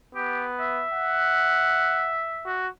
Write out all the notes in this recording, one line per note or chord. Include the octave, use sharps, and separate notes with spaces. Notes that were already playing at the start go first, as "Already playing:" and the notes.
B3 G4
E5
F#5
F#4